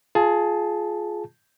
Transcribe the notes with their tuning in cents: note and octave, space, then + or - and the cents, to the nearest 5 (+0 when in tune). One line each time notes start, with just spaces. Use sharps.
F4 +0 G#4 +20 A5 +0